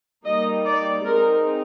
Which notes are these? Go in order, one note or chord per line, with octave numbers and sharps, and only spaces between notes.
G3 A#3 D#4 D#5
D5
G#3 C4 D#4 A#4